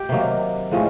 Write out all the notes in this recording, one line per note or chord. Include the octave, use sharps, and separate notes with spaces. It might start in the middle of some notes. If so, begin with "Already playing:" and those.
Already playing: G4
C3 D#3 F#3 A#3
A2 F3 G#3 C#4